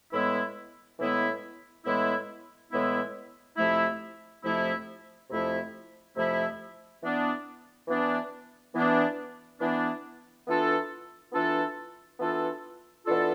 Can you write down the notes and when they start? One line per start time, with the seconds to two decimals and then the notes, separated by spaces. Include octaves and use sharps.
0.12 A2 E3 G#3 B3 E4
0.99 A2 E3 G#3 B3 E4
1.85 A2 E3 G#3 B3 E4
2.71 A2 E3 G#3 B3 E4
3.57 F2 C3 F3 A3 E4
4.43 F2 C3 F3 A3 E4
5.30 F2 C3 F3 A3 E4
6.16 F2 C3 F3 A3 E4
7.02 E3 B3 D4
7.88 E3 B3 D4
8.74 E3 B3 D4
9.60 E3 B3 D4
10.47 E3 B3 D4 F4 A4
11.33 E3 B3 D4 F4 A4
12.19 E3 B3 D4 F4 A4
13.06 E3 B3 D4 F4 A4